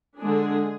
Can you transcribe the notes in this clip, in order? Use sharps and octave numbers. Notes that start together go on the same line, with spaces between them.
D3 G#3 D4 G#4